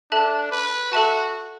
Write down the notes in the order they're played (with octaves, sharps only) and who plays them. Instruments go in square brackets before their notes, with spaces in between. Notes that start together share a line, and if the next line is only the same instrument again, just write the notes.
[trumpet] D4 [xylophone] A4 E5 A5 F#6
[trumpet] B4
[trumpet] F#4 [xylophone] A4 E5 A5 F#6